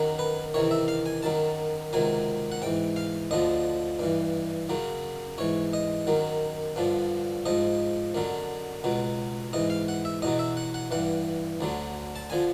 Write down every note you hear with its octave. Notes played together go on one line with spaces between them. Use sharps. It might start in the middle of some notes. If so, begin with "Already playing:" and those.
Already playing: F#2 D#3 F#3
B4
E2 C3 D#3 C#5
E5
F5
G#5
F#2 D#3 F#3 A5
C#2 C3 D#3 F#3 G#5
F#5
G#2 E3 G5
F5
D2 D3 F3 D#5
G2 E3
F#2 C#3 F#3
G#2 E3 C#5
D#5
F#2 D#3 F#3
G2 D3 F3
G#2 F3 D#5
F#2 D3 F#3
C#2 B2 F#3
G#2 E3 D#5
F5
F#5
E5
E2 B2 F#3 D#5
E5
F#5
F#5
G2 E3 F#5
D2 D3 F#3
A5
D3 F3 G#5